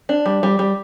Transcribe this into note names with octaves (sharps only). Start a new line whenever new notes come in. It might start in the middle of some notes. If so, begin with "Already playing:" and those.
D4
G3
G3
G3